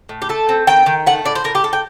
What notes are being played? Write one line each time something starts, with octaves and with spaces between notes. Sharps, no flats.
A2
G4
A3 A4
C4
D#3 G5
D#3
A3 F#5
A2 D5
C5
A2 A#4
G4
A2 A4
G5